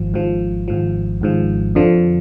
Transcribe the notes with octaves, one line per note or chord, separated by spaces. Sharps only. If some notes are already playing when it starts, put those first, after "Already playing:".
Already playing: G#1 G#2 F3
G#1 G#2 F3
G#1 G#2 F3
G#1 G#2 F3
F2 D3 F3